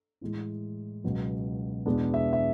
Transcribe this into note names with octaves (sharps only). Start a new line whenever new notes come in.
A2 E3 G#3
C#2 B2 F#3 B3
E2 B2 G#3 B3 D4
E5
E5